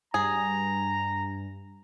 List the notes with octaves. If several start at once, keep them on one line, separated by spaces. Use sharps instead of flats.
G2 G#4 A#5